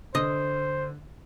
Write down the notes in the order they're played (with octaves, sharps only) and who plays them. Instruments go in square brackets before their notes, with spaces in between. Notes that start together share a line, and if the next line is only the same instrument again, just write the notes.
[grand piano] D3 [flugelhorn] C5 [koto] D#5